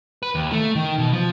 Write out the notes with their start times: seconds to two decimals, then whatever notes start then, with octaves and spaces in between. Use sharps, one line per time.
0.23 B4
0.35 D#2
0.52 A3
0.75 D#3
0.98 B2
1.13 F3